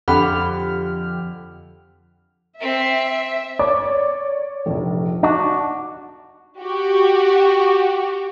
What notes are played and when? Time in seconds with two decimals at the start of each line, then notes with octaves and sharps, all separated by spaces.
0.08 F2 D3 G4 F#5 B5 F6
2.61 C4 E5
3.59 C#5 D5 D6
4.66 F1 A#1
5.23 D4 D#4 F#4
6.62 F#4 G4